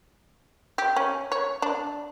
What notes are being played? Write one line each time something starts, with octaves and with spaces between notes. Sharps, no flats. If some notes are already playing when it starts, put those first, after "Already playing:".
G4
C#4
C#5
D4